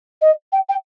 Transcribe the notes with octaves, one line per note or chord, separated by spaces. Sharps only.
D#5
G5
G5